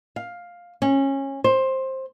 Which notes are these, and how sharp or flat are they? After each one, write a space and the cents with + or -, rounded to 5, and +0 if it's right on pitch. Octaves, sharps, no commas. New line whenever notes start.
F5 +10
C#4 -20
C5 +15